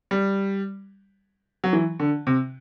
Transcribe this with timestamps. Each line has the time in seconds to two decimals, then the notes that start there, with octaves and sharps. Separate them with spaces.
0.11 G3
1.64 F#3
1.73 E3
2.00 D3
2.27 C3